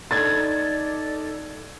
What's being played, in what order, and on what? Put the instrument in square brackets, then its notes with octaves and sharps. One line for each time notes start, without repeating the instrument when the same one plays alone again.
[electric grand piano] D#4 A4 [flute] D5 [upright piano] G#6 A6